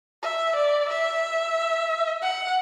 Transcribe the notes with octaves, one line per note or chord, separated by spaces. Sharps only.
E5
D5
E5
F#5